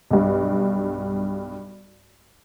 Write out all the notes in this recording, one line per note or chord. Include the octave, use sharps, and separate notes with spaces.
B1 G2